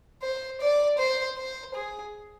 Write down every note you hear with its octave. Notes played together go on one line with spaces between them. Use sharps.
C5
D5
C5
C5
G#4